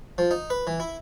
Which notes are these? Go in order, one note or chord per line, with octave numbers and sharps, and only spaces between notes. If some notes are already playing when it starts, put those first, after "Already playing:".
F3
D#4
B4
E3
E4